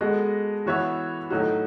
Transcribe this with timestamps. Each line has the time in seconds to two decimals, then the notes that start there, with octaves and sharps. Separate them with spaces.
0.01 G#3 B3 F#4 A4 D#5
0.66 E3 B3 F#4 C#5 E5
1.30 A2 F#3 A3 D#4 F#4